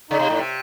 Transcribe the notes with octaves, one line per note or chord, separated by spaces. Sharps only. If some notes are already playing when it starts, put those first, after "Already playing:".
C#3 D#4
C3
A2
C3